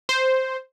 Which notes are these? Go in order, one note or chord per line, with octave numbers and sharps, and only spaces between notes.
C5